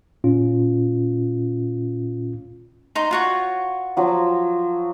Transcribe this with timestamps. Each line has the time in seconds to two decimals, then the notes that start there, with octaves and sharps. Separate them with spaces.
0.24 A#2 C#4 F4
2.95 D#4 C6
3.11 F4 F#4 C#5
3.97 F3 F#3